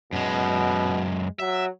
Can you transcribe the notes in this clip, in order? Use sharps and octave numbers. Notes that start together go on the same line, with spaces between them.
F#2 B2 G#3
F#3 E5